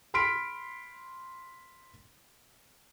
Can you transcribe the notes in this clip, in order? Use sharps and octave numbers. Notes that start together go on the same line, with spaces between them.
B5 C6 F6 B6 D7